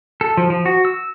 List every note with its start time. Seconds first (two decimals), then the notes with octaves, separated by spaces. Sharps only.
0.21 A4
0.37 F3
0.50 F3
0.66 F#4
0.85 E6